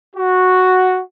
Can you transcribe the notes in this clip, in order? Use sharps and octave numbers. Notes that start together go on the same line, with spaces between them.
F#4